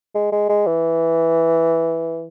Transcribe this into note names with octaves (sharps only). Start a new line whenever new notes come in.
G#3
G#3
G#3
E3